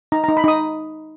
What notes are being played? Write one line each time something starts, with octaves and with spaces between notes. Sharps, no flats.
D#4 A#5
A#5
D#4
B5
D#4 D#6